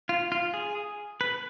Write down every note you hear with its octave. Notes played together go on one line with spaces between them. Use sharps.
F4
F4
G#4
B4